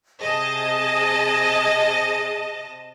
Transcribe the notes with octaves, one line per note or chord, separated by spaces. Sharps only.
C3 G#4 D#5 A5